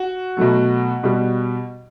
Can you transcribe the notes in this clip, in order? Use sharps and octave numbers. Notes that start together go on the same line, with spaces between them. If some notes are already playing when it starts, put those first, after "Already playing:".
Already playing: F#4
B2 F#3 A3
B2 G3